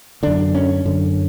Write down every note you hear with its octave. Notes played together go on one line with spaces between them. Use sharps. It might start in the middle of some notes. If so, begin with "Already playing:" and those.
F#2 D3 D4
C#4
F#2 D3